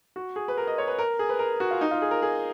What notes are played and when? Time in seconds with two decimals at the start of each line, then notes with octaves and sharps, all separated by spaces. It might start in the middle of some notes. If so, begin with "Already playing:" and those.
0.16 F#4
0.36 G#4
0.48 B4
0.57 A#4
0.67 D#5
0.78 C#5
0.88 B4
0.98 A#4
1.19 G#4
1.29 B4
1.39 A#4
1.60 F#4
1.71 F4
1.81 D#4
1.91 F4
2.02 G#4
2.11 A#4
2.22 G#4